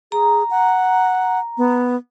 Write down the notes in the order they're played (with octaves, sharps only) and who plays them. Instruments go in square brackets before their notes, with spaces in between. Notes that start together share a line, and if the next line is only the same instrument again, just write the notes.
[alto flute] G#4 [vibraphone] A#5
[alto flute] F#5
B3